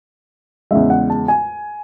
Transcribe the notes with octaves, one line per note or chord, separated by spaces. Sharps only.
E2 C#3 G#3 E5
F#5
A5
G#5